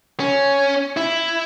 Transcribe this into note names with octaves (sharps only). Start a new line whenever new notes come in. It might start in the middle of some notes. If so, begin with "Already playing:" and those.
C#4
E4